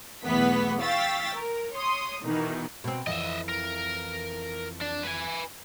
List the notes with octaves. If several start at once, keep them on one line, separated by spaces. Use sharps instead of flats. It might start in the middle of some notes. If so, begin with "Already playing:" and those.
B1 E2 E3 A3 B3 B6
F5 G5 C#6 E6 A6 B6
A#4
C#5 C6 D#6
B2 D#3 E3
B2 C4
F2 E3 D#5 E5
A#4
D4
B4 G#5